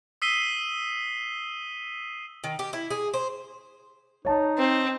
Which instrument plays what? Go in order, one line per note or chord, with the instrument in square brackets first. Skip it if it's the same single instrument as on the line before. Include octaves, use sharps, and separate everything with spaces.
[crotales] D#6 E6 B6 C7 D#7 G7
[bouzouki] D#3
G4
E4
G#4
C5
[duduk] D#4 [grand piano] C#5 A5
[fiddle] C4